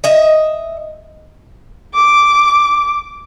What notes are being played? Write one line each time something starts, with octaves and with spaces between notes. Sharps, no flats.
D#5 E5
D6